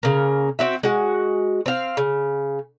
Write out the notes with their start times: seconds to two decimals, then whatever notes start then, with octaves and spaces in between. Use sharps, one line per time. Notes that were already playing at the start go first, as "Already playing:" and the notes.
0.03 C#3 A#3
0.59 C4 F#4 E5
0.83 G#3 F#4
1.66 C4 F5
1.97 C#3